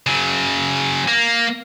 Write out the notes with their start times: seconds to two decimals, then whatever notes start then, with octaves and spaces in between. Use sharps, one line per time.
0.06 C#3 F#3
1.08 A#3